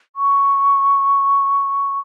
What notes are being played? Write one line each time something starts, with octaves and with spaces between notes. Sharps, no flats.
C#6